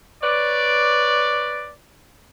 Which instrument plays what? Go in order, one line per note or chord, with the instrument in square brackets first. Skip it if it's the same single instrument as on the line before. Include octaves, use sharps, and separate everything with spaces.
[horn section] B4 C#5 D5